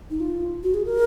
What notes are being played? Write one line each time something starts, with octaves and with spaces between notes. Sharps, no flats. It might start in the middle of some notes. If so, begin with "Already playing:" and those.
D#4
F4
F#4
G#4
A#4